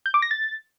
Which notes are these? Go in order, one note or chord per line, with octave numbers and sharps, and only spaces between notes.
G6
D6
A#6
A6